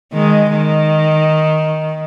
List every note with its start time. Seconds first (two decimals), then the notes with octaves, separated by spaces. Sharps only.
0.13 D#3 G#3
0.51 D#3